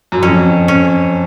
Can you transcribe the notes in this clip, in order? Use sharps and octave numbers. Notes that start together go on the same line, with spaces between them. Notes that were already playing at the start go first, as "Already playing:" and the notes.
F#2
F2 C#4
C#4